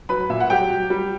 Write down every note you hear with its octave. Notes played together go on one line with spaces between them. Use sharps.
F#3 B4 B5
A#2 E5
F#5
F#3 G4 G5
F#3
G3